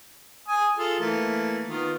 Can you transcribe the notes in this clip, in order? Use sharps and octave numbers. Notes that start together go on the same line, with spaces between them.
G#5 D#6
F4 G#4 A4
E3 A3 A#3
D#3 B3 F4